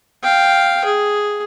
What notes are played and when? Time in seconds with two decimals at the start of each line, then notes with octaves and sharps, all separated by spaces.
0.23 F5 G5
0.85 G#4